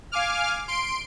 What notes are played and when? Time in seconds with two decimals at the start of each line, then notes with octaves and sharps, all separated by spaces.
0.12 F5 G#5 D6 F6
0.68 C6 D7